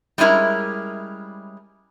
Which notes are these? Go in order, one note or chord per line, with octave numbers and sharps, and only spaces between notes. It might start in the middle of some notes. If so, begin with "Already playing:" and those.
G3 G#3 C#4 E4 A#4